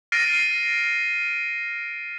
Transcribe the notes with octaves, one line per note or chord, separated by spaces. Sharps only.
F6 A6 A#6 C7 D7 D#7